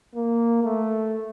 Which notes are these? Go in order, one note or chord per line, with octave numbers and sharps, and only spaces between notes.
A#3
A3